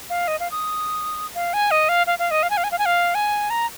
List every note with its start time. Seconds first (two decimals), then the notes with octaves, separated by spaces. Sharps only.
0.10 F5
0.28 D#5
0.40 F5
0.51 D#6
1.35 F5
1.53 G#5
1.71 D#5
1.89 F5
2.07 F5
2.19 F5
2.31 D#5
2.43 F5
2.50 G#5
2.57 F5
2.64 G#5
2.71 F5
2.79 G#5
2.86 F5
3.15 G#5
3.50 A#5